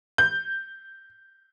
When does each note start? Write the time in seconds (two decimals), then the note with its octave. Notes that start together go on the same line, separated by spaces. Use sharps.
0.18 G6